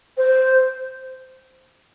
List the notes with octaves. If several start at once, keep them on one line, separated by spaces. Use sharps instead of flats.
C5